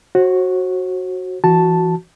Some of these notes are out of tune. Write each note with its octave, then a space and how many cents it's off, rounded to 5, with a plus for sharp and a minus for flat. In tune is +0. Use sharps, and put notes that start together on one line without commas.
F#4 +0 C5 +45
E3 +30 F#4 +0 A5 +0